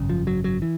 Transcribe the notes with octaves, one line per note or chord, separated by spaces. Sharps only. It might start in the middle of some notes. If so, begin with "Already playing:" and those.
Already playing: G#1 F#2 C#3
F3
F#3
F#3
E3